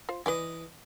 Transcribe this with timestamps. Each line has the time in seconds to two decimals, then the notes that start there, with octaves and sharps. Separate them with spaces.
0.09 F4 C5
0.26 E3 B4 D5 D#5 G#5